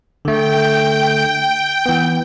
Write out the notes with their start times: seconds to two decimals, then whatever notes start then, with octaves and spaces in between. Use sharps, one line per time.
0.25 D3 A3 G5
1.86 E3 B3